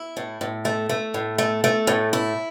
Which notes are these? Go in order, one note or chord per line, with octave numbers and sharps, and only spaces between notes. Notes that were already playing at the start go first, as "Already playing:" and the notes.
Already playing: E4
A2
A2
A3
A3
A2
A3
A3
A2
E4